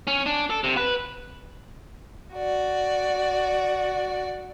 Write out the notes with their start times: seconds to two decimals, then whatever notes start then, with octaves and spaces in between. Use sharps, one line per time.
0.07 C#4
0.26 D4
0.50 A4
0.64 C3
0.77 B4
2.34 F#4 D5